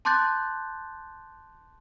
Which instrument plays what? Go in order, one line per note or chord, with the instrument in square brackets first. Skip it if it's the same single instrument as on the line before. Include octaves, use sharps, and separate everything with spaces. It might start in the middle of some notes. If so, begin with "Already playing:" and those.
[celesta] A5 C6 D6 F#6 G6 A6